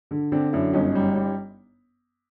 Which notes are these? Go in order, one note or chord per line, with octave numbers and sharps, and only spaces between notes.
D3
D3 C4 D4
F#2 D4 E4
G1 C#4 D#4
G3
G3